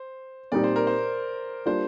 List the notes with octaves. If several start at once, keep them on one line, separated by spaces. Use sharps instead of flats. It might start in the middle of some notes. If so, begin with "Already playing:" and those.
Already playing: C5
A#2 G3 C4 D#4 G4 D5
C5
A#4
C5
G3 A#3 D4 F4 C5